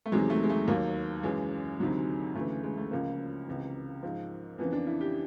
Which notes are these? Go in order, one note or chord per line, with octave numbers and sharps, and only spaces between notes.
A3
E2 C3 D#3 F#3 G#3
A3
G#3
A3
D#2 D#3 F#3 A#3
F#2 C#3 E3 G#3
D2 C3 D#3 F#3
D2 C#3 E3 A3
G#3
A3
C#2 C#3 F3 A#3
C#2 C3 E3
G#2 F3
F2 C#3 E3 B3
D4
E4
G4